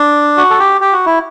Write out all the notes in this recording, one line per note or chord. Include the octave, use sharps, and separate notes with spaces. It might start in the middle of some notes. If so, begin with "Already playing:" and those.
Already playing: D4
F#4
A4
G4
G4
F#4
E4